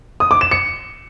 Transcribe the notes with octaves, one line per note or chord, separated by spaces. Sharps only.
D#6
D6
E7
C#7